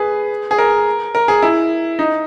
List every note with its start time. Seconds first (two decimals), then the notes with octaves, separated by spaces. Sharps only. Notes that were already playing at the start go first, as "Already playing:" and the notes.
Already playing: G#4 B4
0.51 G#4
0.58 A#4
1.15 A#4
1.28 G#4
1.42 E4
1.99 D#4